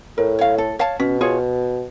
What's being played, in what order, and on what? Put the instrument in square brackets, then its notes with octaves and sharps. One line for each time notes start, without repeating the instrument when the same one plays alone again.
[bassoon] A2 [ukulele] A#4
[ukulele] C#5 F5
A4
C#5 F5 A5
[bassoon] B2 [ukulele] C#4
[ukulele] F4 G#4 C#5